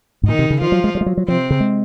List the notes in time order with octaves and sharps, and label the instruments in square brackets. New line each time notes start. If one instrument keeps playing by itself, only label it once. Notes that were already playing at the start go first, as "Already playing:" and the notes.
[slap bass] G#2
[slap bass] A#2 [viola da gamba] D#3 D#4
[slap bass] C3
C#3
[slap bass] D#3 [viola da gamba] F3 F4
[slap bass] F#3
G#3
F#3
G#3
F#3
F#3
[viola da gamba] C3 C4 [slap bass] F3
[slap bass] C#3
G#3